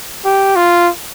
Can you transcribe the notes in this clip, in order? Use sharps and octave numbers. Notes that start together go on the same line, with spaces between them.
G4
F4